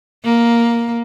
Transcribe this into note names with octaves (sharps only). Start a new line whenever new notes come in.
A#3